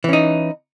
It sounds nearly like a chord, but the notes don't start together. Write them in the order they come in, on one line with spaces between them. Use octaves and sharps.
E3 C#4 D#4